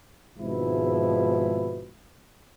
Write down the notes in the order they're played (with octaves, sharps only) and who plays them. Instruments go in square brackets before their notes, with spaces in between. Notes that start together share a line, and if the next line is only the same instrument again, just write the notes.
[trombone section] G#1 G#2 B2 F3 E4